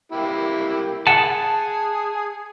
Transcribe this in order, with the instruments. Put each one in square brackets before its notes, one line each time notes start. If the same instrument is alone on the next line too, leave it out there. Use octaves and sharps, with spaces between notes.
[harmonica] A#3 E4 G4
[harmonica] G#4 [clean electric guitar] F#5 A5